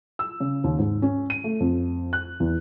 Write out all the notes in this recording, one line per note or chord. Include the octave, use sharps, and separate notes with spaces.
E6
C#3
D#2
G#2
C#4
D#7
A3
F2
F#6
E2